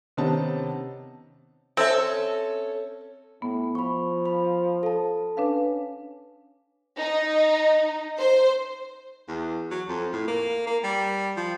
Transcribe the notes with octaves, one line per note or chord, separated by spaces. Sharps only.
C3 D#3 B3 C#4 D#4 A5
C4 C#4 A4 E5
A2 B3
F3 B5 C#6
B5
A4 A5
C#4 D4 B4 F5
D#4
C5
E2
F#3
F2
A2
A#3
A#3
G3
F3